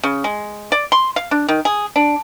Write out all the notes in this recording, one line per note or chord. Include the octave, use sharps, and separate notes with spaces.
C#3
G#3
D5
C6
F5
D4
D#3
G#4
D4